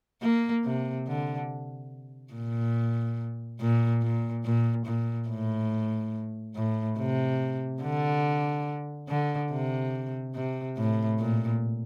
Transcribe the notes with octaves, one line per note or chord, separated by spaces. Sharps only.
A#3
C3
D3
A#2
A#2
A#2
A#2
A#2
A2
A2
C3
D3
D3
C3
C3
A2
A#2